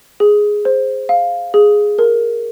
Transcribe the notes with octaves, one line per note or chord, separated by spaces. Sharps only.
G#4
C5
F5
G#4
A#4